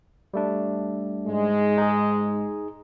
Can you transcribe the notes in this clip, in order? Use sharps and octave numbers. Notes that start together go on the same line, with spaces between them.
G3 A3 D4
G#2 G#3
D#4 G#4